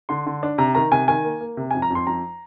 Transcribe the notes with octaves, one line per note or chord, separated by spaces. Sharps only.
D3 C6
D3
D4
C3 A#5
D#3 A#5
C3 G#5
D#3 G#5
A#3
A#3
C3
G#5
F2
A#5
F2 C6
F2 A#5